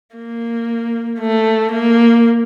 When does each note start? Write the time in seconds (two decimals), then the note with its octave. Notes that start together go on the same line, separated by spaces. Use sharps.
0.16 A#3
1.19 A3
1.71 A#3